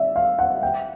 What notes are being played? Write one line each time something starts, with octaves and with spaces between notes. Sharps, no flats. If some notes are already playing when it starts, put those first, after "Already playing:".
Already playing: D5 E5
F5
F#5
G5